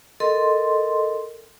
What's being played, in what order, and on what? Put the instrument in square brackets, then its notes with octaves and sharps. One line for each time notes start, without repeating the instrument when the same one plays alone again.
[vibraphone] A4 A#4 D#5 C6